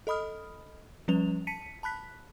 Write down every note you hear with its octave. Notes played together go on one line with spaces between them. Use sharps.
A4 D#5 B5 D#6 F6
F3 G3 C#4 B4 F7
A5 B6 C#7 D#7
A5 B5 F#6 B6